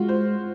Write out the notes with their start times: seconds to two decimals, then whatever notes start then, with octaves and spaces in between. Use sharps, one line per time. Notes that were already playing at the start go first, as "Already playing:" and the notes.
Already playing: G#3 F4 F#4
0.08 C5